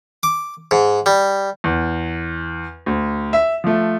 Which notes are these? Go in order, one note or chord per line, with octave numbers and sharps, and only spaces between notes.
D6
G#2
G3
E2
D2
E5
F3 A3